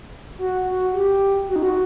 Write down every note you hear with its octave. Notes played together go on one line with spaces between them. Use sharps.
F#4
F#4
G4
F#4
D#4
F#4